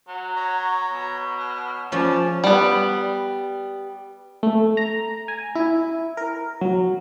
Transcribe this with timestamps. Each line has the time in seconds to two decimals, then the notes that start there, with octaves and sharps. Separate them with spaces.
0.08 F#3
0.36 C#5 A#5
0.92 B2
1.40 C#5 F6
1.92 C#3 F3 C#4 D5 A5
2.44 G3 B3
4.43 A3
4.77 A#5
5.28 G#5
5.55 E4
6.17 A#4
6.61 F#3